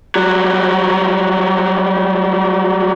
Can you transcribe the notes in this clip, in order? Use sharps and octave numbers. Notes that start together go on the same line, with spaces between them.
F#3 G3